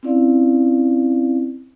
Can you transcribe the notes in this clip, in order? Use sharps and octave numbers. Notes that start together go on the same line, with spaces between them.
C4 C#4 E4 D5 F5